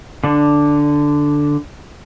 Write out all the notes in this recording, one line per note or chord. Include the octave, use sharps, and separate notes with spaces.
D3 D4